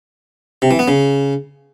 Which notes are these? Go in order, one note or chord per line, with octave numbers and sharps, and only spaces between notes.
C3
E3
B3
C#3